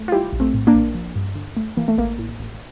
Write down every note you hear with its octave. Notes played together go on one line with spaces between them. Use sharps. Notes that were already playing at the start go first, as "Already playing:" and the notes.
Already playing: A3
F4
G3 E4 G4
A#1
A3 C4
A2
A#3 D4
A#1
F3
G2
D3
A3
E3 A#3
A3
A1 A#3
A2
A1